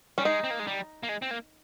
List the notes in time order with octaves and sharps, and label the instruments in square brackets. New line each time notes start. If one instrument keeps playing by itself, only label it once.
[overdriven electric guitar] G3 [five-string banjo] C#4
[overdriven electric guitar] G#3 [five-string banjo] D#4
[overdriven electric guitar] C4
A#3
G#3
G3
A#3
G#3
C4
A#3